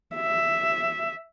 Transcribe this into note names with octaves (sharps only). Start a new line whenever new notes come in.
E5